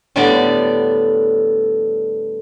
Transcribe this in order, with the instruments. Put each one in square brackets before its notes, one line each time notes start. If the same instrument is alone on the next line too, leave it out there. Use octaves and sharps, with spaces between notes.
[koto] A2 D3 G3 B3 D5